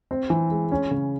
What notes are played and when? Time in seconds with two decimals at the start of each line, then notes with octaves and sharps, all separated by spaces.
0.11 C4
0.30 E3
0.51 G#3
0.72 C#4
0.91 C#3